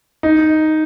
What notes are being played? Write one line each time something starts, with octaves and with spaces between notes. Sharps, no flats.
D#4